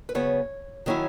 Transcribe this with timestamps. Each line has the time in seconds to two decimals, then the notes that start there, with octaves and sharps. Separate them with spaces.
0.09 B4
0.15 C#3 F#3 B3 C#5
0.86 D#3 F#3 C#4 E4